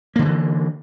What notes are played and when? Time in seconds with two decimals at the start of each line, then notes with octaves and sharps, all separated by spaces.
0.16 A#3
0.19 D3
0.22 G3
0.25 E3